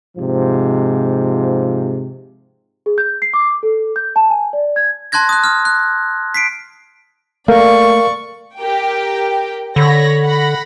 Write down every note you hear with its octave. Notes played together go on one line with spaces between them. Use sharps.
G#2 C3 F3
G#4
G6
C7
D6
A4
G6
A5
G#5
D5
G#6
A5 C6 F#6 G#6 A#6
D#6 F#6
D#6 F6
F#6
B6 C7 D7
A3 A#3 A#4 D5 F5 C#6
G4 A#4 G5
D3 C#5 B5 A#6
F#5 B5 A#6